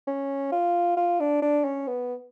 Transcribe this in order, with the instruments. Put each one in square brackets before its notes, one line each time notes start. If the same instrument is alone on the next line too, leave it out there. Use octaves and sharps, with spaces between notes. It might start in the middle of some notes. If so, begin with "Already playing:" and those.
[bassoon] C#4
F4
F4
D4
D4
C#4
B3